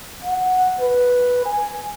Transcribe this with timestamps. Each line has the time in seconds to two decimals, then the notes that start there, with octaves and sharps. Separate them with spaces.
0.24 F#5
0.80 B4
1.45 G#5